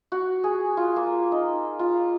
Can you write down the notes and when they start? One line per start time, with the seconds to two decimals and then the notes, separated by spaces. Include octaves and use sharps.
0.12 F#4
0.44 G#4
0.77 F4
0.96 A#3
1.32 D#4
1.79 F4